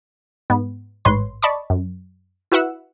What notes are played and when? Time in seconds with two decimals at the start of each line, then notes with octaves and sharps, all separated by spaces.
0.50 G#2 B3
1.05 A1 G#2 B4 C#5 C6
1.42 D5 D#5 A5 B5 C#6 D6
1.70 F#2
2.52 E4 F#4 B4 E5 F#5 E6